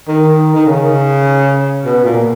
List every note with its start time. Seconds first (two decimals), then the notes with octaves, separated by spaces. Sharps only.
0.08 D#3
0.55 D#3
0.67 C#3
1.85 B2
2.04 A#2